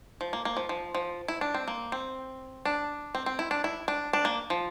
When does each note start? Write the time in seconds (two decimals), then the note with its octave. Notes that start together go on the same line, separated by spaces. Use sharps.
0.21 F3
0.33 A#3
0.45 A#3
0.57 F3
0.69 F3
0.95 F3
1.28 E4
1.41 D4
1.54 C4
1.68 A#3
1.92 C4
2.65 D4
3.15 C4
3.26 C4
3.39 E4
3.51 D4
3.64 E4
3.88 D4
4.13 D4
4.25 A#3
4.50 F3